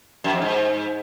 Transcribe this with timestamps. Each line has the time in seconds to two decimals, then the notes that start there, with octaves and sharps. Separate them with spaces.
0.24 F#2
0.33 F2
0.42 G#2